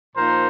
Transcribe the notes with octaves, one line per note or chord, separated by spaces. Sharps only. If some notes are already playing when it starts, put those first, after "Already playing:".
A#2 F3 A#3 D#4 A#4 C5